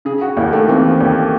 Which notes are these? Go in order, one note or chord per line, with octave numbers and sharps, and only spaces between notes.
C#3 G#4
F#4
D#2 E4
A3
E3 C4
D#2